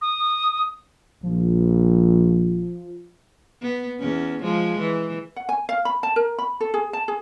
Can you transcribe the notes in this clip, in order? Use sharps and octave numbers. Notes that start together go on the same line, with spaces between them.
D#6
A#1 F3
B3
E2 C#4
F3 G#3
E3
F#5
G#5
F5
B5
A5
A#4
B5
A4
G#4
A5
G#4